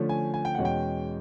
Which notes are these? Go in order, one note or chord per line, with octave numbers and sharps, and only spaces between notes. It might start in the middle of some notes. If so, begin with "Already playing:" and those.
Already playing: D3 F3 A3 C#4
G#5
G#5
G5
E2 B2 G#3 C#4 F#5
G5